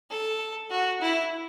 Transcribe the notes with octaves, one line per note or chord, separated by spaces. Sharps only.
A4
F#4
E4